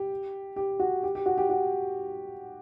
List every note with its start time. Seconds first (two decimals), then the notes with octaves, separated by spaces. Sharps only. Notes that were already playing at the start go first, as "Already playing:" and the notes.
Already playing: G4
0.56 G4
0.80 F#4
1.03 G4
1.15 G4
1.26 F#4
1.38 G4
1.49 F#4